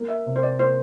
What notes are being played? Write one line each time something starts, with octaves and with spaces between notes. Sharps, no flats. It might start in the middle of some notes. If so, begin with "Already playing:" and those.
Already playing: A#3
E5
C3
C5
D5
A#3 C5